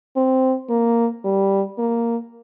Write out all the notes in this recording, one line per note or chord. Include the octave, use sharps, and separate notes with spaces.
C4
A#3
G3
A#3